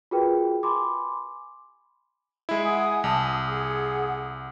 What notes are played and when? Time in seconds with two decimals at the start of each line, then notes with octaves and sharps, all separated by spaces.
0.11 F4 F#4 G#4 A#4 B4 G5
0.63 G#5 B5 C6 D6
2.49 G#3 E4
2.64 F#5 G#5 D#6
3.04 C2 G#5 A5 D#6
3.48 G#4 F#5